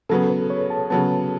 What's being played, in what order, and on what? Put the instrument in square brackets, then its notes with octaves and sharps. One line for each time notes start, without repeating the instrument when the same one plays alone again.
[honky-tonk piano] C#3 F#3 B3 [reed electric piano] A4
[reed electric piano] B4
C#5
A5
[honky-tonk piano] C#3 F#3 B3 [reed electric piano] A5